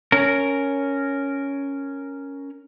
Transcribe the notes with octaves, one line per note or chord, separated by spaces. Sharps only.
C#4 A#4